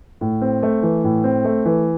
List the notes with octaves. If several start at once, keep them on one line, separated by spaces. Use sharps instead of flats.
A2
C4
A3
E3
A2
C4
A3
E3